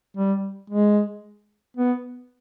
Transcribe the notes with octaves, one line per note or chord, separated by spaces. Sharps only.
G3
G#3
B3